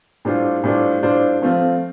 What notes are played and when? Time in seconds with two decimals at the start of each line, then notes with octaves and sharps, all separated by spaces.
0.25 A2 G3 D4 F4 C5
0.64 A2 G3 D4 F4 C5
1.03 A2 G3 D4 F4 C5
1.42 F3 A3 C4 F4